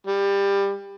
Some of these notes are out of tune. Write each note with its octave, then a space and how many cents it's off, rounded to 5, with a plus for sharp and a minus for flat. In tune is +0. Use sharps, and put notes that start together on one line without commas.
G3 +20